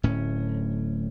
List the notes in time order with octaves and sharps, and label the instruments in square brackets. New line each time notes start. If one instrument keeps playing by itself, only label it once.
[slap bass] D1 A2 C#4